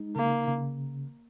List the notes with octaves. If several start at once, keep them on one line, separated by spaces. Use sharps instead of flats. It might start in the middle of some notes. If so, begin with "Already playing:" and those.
Already playing: G#3 D#4
C#3 A#3
C#3